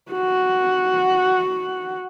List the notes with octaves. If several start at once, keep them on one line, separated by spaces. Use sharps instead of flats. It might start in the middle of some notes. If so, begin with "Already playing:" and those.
F#4 F#5